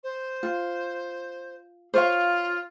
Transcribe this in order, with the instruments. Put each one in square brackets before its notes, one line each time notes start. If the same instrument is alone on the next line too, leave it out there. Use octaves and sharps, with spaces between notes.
[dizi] C5
[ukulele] F4
[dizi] F4 [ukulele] C5 C#5 F5